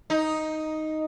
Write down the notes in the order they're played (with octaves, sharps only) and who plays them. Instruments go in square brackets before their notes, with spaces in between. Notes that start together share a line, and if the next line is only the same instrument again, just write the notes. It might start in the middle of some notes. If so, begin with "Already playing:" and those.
[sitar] D#4